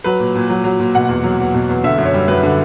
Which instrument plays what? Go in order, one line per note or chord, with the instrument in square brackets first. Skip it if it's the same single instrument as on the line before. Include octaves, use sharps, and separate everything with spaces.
[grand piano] F#3 B4
A#2
A#2
F#3
F#3
A#2
B2 F#5
E2
F#3
E2
B2
E2
D3 E5
F#2
C#5
G3
F#2 B4
D3